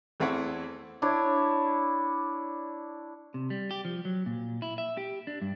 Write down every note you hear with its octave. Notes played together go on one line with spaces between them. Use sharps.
E2 A3 C4 E4 F#5 C#6
D4 E4 C#5
C3
G3
G4
F3
F#3
A#2
E4
E5
G4
D4
G2